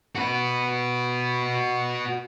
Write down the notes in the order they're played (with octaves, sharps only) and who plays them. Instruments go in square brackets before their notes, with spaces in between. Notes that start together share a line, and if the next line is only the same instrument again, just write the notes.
[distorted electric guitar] F#4 B4